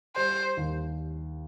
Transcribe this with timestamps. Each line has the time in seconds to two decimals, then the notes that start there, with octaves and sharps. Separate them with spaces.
0.16 G3 C5
0.57 D#2